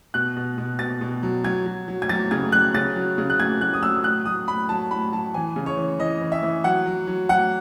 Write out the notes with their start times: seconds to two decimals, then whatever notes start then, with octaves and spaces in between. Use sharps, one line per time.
0.14 B2 F#6
0.36 B2
0.58 B2
0.79 B2 A6
1.01 B2
1.23 F#3
1.44 F#3 G#6
1.66 F#3
1.88 F#3
2.02 G#6
2.09 F#3 A6
2.31 C#3 G#6
2.52 F#3 F#6
2.74 C#3 A6
2.96 F#3
3.18 C#3
3.30 F#6
3.39 F#3 G#6
3.61 F#3 F#6
3.73 D#6
3.82 F#3 E6
4.04 A2 F#6
4.25 F#3 D#6
4.48 A2 B5
4.69 F#3 A5
4.91 A2 B5
5.12 F#3 A5
5.34 E3 G#5
5.56 C#3
5.66 C#5
5.77 E3
5.99 E3 D#5
6.21 E3
6.32 E5
6.43 E3
6.64 F#3 F#5
6.86 F#3
7.07 F#3
7.29 F#3 F#5